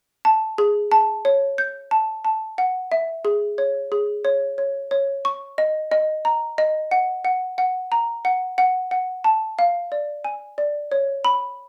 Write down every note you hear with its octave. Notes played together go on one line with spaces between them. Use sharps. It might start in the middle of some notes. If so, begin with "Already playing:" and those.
A5
G#4
A5
C#5
G6
A5
A5
F#5
E5
G#4
C#5
G#4
C#5
C#5
C#5
C#6
D#5
D#5
A#5
D#5
F#5
F#5
F#5
A#5
F#5
F#5
F#5
A5
F5
D5
G#5
D5
C#5
B5